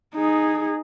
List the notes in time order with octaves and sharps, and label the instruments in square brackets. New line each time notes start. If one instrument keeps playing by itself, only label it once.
[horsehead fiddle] D#4 G#4